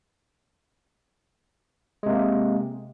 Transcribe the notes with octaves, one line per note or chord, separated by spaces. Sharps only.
C3 G#3 A#3